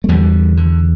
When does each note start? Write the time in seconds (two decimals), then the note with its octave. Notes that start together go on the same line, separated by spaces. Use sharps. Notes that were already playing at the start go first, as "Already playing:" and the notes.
0.04 A3
0.08 E2 D3 G3
0.57 D3